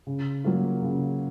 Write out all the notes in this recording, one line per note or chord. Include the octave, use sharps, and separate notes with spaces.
C#3
F#3 A#3 F4
C#3